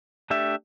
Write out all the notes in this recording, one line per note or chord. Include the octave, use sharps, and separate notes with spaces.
A3 D4 G4 E5